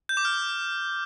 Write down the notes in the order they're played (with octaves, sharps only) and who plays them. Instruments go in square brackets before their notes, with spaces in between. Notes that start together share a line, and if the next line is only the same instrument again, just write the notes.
[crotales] G6
D6
F6